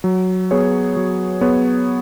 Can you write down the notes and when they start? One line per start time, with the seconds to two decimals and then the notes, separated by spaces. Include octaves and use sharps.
0.04 F#3
0.51 B3 G#4 C#5
0.97 F#3
1.41 B3 G#4 C#5